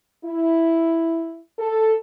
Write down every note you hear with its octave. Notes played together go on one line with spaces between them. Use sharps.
E4
A4